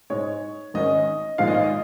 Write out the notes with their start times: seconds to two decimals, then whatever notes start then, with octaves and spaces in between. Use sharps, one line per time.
0.10 G#2 G#3 D#4 C#5
0.74 G#1 G#2 D#3 C#4 D#5
1.38 A#1 G#2 D#3 G#3 F5
1.48 D#5
1.54 F5
1.64 D#5